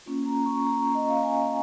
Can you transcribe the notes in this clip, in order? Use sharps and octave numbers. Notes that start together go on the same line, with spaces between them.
A#3 C#4 F4
A#5
C#6
A#5
D#5
F5
G#5